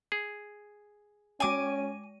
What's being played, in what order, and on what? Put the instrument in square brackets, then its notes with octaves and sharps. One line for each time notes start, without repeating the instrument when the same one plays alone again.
[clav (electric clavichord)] G#4
[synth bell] G#3 D#7 [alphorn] C#4 [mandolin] G#5 D6